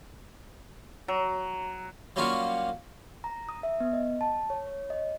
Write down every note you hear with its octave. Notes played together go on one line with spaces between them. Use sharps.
F#3
F#3 G3 A#3 C#4 F4 F#4
A#5
D#6
E5
B3
D#5
A5
C#5
C#5
D#5